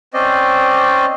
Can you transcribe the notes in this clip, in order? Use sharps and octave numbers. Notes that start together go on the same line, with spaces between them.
C4 C#4 C5 D5 D#5